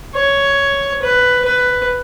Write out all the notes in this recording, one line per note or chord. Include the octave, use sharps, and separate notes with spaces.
C#5
B4
B4